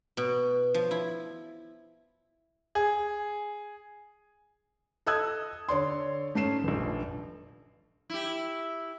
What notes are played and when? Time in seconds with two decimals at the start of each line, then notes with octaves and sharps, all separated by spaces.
0.17 B2
0.74 F3
0.91 E4
2.75 G#4
5.06 A4 D#5 D#6 E6 F#6 G#6
5.69 D3 C#5 D5 C6
6.34 G#2 A3 C#4 C7 E7
6.64 F1 A#1
8.10 E4 G4